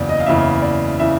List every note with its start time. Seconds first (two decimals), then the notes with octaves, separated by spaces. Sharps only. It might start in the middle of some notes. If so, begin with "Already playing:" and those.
Already playing: F#1 E2 C#3 E3 D5
0.09 D#5
0.20 F5
0.26 F#1 E2 C#3 E3 E5
0.62 D5
1.00 C#3 E3 E5